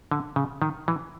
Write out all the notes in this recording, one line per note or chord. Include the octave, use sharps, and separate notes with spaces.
D3
C#3
D#3
E3